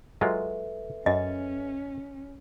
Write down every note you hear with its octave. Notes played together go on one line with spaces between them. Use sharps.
F#3 G#3 F4 A4 B4 E5
F#2 C#4 D#5